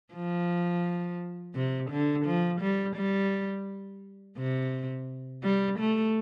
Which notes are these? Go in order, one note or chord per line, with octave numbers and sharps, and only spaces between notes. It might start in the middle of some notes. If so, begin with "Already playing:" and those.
F3
C3
D3
F3
G3
G3
C3
G3
A3